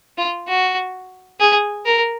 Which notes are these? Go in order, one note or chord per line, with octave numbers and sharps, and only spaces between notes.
F4
F#4
G#4
A#4